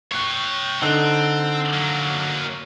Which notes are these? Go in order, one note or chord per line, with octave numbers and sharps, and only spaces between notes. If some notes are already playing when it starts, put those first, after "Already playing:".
C#5 G5 C#6 F#6
D3 C4 D#4
F#3 A#3